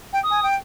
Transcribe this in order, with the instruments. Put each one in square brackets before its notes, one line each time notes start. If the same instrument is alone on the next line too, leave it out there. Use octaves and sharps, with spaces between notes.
[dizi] G5
[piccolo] D#6
[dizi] G#5
G5